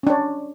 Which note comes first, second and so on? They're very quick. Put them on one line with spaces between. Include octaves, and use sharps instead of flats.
C#4 D4 C#5